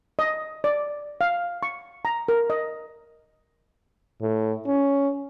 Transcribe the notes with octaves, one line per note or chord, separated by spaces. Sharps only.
D#5
D5
F5
C#6
A#5
A#4
D#5
A2
C#4